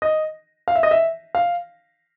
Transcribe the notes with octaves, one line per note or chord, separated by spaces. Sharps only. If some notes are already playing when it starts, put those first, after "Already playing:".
D#5
F5
E5
D#5
E5
F5